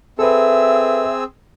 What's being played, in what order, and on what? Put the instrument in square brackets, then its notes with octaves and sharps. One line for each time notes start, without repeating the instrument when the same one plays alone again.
[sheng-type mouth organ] C4 G#4 E6 [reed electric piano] A4 B4 [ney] E5